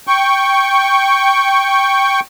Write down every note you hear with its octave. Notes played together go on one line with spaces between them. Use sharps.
G5 C#6